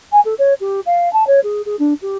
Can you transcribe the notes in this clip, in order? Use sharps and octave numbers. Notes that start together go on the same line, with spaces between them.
G#5
A4
C#5
G4
F5
A5
C#5
G#4
G#4
D4
G4